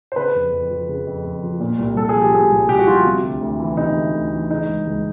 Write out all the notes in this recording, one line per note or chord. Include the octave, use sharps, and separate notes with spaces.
C5
C#3 B4
F2
F2
F3
C#3
F2
F2
F3
A#2
C2
C2 A4
G#4
F3
G4
A#2 G#4
C2
C2 G4
F#4
F3 F4
G4
C3
D2
D2
E3
C3 D#4
D2
D2
E3
C#3 D#4
C#2
C#2